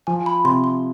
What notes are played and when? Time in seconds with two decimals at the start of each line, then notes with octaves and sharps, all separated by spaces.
0.07 F3 G#5
0.26 B5
0.45 C3 C6
0.64 C6